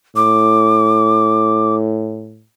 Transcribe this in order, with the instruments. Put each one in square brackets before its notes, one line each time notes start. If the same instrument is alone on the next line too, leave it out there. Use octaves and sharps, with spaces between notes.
[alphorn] A2 [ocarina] D6